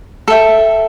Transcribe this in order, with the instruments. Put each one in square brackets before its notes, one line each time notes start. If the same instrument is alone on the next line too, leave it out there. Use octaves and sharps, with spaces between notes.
[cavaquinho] A4 E5 G5